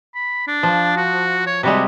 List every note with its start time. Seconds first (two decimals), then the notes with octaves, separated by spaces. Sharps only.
0.15 B5
0.47 D4
0.63 F3
0.96 F#4
1.47 C#5
1.63 C3 G3 G#3 F#4